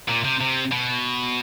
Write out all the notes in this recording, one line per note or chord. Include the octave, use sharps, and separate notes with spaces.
A#2
C3
C3
B2